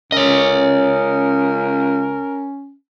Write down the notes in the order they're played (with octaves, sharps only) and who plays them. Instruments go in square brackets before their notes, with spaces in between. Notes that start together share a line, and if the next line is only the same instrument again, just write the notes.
[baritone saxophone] C#2 [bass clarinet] C#4 [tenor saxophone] A#4 [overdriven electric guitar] C#5 D#5